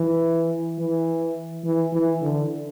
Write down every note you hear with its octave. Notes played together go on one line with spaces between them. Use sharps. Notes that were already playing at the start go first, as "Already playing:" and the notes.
Already playing: E3
E3
E3
E3
D3